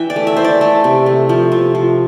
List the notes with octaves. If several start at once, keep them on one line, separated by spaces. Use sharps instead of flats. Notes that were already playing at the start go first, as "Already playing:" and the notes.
Already playing: E3 E5 G5
D5
A3
E5
E3 C5
D5
A3 A4
C3
A3
F3
C3
F3